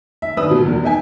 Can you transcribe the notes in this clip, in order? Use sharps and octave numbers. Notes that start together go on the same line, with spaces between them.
E5
G2 D#3 B4 D#6 E6
D2 B2
E1 E2 G2
B3 D#4 E5 G5 G#5